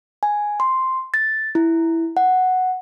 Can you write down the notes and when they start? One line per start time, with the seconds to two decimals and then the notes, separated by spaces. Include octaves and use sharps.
0.23 G#5
0.60 C6
1.14 A6
1.55 E4
2.17 F#5